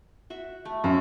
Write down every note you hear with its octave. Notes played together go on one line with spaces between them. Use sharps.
F#4 E5
A3
F#2 F#3 F#4